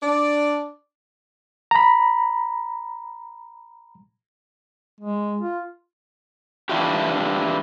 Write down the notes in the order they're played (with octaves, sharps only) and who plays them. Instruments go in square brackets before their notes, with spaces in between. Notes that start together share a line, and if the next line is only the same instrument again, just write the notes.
[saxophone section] D4 D5
[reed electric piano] A#5 B5
[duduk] G#3
F4
[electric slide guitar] E3 A3 D4 E4 F4 G4